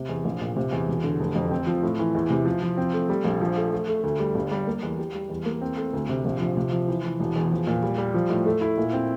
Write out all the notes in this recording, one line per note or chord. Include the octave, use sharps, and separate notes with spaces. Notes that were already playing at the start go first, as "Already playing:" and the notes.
Already playing: C3
E2
A#1
A#2
C3
E2
E1
D3
F1
F2
C4
F3
A2
E3
E2
C3
F3
F3
C4
A3
G3
A#1
F3
A3
A3
A3
D2
G3
G1
G3
A#3
E2
G4
G3
E2
A#3
C4
A3
D2
C3
A#1
F3
C3
F3
E3
E3
E1
E2
F3
A#2
G3
G3
F3
A2
A3
E4
A#2
C4